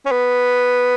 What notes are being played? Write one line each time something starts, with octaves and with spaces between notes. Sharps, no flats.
C#4
B3